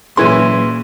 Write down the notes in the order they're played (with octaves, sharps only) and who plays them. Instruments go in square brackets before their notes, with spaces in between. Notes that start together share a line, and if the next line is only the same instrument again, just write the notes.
[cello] A#2 [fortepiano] E3 C#4 [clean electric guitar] F#3 C6 [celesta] G#4 G#6 D#7